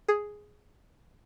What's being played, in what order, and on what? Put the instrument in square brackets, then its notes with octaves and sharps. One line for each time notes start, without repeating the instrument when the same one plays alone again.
[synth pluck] G#4